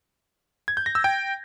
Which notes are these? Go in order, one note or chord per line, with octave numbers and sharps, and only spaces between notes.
G#6
G6
A#6
E6
G5